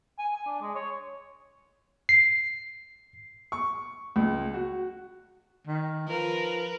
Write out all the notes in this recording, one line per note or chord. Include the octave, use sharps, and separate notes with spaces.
G#5
G#5
D4
G#3
C#5
C7
C#6
C#2
F#4
D#3
F3 A#4 B4